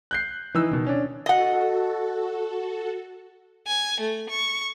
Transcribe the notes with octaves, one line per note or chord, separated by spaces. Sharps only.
F#6 G6 C7
E3 D#4 E6
B2 D#3
C#4 D4
F#4 A4 D#5 F#5
G#5
A3
C#6